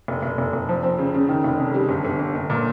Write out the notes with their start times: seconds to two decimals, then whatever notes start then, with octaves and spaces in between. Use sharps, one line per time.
0.08 F1
0.22 F1
0.38 F1
0.53 F1
0.69 F3
0.83 C4
0.98 C#3
1.14 C#3
1.29 D#3
1.44 F1
1.59 F2
1.74 G3
1.89 G1
2.05 G1
2.19 G1
2.35 G1
2.50 A#2